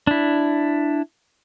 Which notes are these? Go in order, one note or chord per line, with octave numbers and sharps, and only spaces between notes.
D4 E4